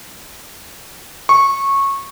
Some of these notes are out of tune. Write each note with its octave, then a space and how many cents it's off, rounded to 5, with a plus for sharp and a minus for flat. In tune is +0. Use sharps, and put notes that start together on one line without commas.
C#6 -15